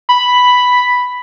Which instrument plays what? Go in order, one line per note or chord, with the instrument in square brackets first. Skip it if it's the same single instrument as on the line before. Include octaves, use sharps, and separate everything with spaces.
[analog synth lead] B5